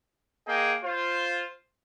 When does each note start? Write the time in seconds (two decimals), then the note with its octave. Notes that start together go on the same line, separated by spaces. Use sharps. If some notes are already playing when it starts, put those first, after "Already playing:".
0.48 A#3 G#4 D#5 G5
0.83 F4 C5